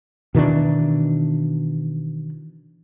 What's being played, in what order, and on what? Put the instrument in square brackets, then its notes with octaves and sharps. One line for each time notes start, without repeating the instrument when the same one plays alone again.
[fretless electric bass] B2 D#3 E3 D4